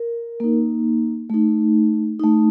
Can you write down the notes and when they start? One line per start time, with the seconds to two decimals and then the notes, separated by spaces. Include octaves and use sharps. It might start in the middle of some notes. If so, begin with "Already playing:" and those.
Already playing: A#4
0.40 A#3 D#4
1.30 A3 D#4
2.20 A3 D#4